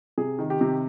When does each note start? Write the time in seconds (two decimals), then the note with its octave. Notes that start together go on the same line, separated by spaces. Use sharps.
0.18 C3 G#4
0.39 D#3
0.50 G4
0.61 C3